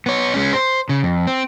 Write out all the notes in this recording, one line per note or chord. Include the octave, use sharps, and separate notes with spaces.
B3 C#5
G#3 C#4
C5
C#3
F2
C4